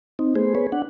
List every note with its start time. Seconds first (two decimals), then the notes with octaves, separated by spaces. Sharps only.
0.19 C4 D#4
0.35 A3 B3 G#4 C5
0.55 B3 G#4 B4 C#5
0.72 D4 F#5